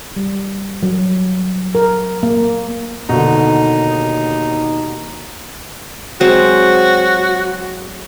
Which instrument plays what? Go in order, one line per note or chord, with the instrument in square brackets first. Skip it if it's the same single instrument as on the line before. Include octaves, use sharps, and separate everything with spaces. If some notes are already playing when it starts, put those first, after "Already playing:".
[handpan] G3
F#3
A#4
A#3
[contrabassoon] D#2 [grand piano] B2 D3 [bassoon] D#4
[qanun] F#3 G#3 C4 [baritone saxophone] F#4